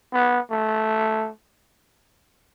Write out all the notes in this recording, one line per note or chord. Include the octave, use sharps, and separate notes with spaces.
B3
A3